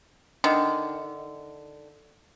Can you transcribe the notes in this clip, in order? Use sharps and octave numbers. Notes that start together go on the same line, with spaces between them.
D3 D#3